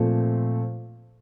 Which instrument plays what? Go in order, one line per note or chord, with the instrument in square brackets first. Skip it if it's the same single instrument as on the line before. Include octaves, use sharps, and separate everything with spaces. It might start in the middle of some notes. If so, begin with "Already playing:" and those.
Already playing: [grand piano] A#2 F3 A3 C4